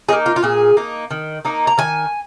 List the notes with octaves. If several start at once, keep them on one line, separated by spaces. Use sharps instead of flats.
A#3 D#4 G#4
F4
F4
A#2 G#4
A#3 D#4
D#3
A#3 D#4
A#5
D#3 G#5